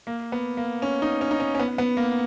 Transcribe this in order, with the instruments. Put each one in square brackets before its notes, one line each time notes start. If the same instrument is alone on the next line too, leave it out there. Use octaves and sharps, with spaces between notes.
[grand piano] A#3
B3
A#3
C#4
D#4
C#4
D#4
C#4
C#4
B3
B3
A#3